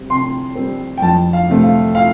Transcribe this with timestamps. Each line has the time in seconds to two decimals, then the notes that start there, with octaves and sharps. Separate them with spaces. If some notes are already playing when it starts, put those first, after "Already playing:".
Already playing: C3 G3 C4
0.10 C3 C6
0.56 G3 C4
0.97 G5
1.02 F2 A5
1.33 F5
1.49 C3 A3 C4
1.63 F5
1.95 F5